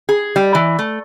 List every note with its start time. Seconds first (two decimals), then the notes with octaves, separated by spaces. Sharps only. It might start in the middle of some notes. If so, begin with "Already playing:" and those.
0.09 G#4
0.36 G3
0.55 E3
0.79 A3